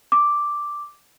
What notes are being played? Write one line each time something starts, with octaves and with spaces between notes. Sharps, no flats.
D6